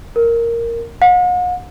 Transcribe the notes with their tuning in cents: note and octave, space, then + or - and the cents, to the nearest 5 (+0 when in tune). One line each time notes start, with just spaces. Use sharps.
A#4 -5
F#5 -45